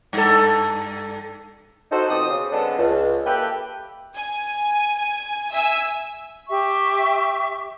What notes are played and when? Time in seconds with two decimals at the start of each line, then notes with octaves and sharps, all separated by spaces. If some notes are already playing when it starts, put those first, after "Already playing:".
0.13 G2 A4
1.92 D#4 F#4 A4 C5
2.10 F2 B2 C4 D6 D#6
2.30 C#3
2.52 D3 G#3 B3 C4 D4 A4
2.78 C#2
3.26 A#3 G4 A4 B4 E5 G5
4.15 G#5
5.51 E5 G#5 E6
6.48 G4 E5 C#6